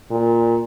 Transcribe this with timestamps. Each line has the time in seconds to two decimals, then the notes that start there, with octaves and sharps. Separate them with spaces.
0.11 A#2